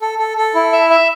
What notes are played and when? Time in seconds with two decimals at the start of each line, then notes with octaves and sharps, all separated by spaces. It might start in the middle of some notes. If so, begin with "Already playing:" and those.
0.02 A4
0.19 A4
0.37 A4
0.55 E4
0.73 E5
0.90 E5